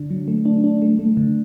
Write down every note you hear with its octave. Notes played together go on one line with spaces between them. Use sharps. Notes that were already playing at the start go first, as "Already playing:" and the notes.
Already playing: D3 D4
F#3
A3
D4
D4
A3
A3
D3